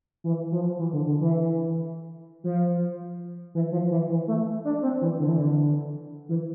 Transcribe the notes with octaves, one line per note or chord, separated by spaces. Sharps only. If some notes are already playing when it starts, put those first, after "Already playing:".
E3
F3
E3
D3
D3
E3
F3
E3
F3
E3
E3
A3
D4
C4
E3
D3
E3
D3
E3